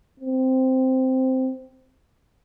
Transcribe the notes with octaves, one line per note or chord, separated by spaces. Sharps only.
C4